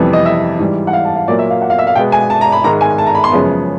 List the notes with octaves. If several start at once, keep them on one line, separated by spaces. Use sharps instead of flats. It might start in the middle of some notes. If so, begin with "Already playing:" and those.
Already playing: F2 C3 E3 G3 B3
D#5
E5
G#2 E3 G3
F#5
F5
A5
F5
A#2 F#3 A#3 D5
E5
F5
F#5
F5
E5
F5
B2 G#3 B3 G5
G#5
A5
A#5
B5
G#2 D#3 G#3 A#5
G#5
A5
A#5
B5
C6
F#2 C#3 F3 G#3 B3